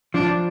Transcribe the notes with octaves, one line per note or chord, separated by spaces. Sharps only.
F3 D4